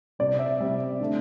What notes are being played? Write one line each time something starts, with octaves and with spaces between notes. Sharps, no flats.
C3 G3 D5
E5
C3 G3
D3 A3